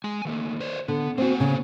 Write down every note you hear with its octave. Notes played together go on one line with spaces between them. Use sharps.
G#3 G#5
D#3 A3 A#3
B4 C5 D5
D3 B3
A#3 C4 F#4 C5 G#5
C#3